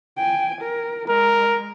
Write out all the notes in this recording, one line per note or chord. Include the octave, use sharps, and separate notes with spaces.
G5 G#5
A#4
G#3 A#4